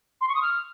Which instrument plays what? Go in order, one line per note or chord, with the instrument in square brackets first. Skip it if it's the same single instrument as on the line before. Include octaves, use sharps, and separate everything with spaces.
[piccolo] C6
C#6
D#6
F6